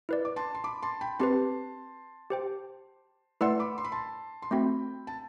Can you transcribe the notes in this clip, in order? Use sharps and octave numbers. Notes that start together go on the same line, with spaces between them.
E4 B4 D5
D6
A5 C6
C6
B5 D6
A5 C6
G5 B5
C4 G4 B4 A5 C6
G4 C5 G5
A3 E4 B4 D5 F#5 C6 E6
B5 D6
C6
B5
A5 C6
C6
A3 C4 F#4 G5 B5
A5